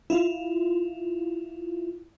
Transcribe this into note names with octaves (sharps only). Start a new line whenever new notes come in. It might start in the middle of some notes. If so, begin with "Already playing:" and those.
E4 F4